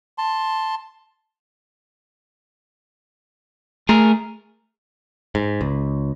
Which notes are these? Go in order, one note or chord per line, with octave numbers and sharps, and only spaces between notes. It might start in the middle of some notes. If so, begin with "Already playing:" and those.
A5 C6
A3 G#4 A#4
G#2
C#2